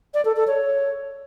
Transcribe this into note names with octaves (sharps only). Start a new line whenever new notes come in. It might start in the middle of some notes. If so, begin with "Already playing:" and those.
D5
A4
A4
C#5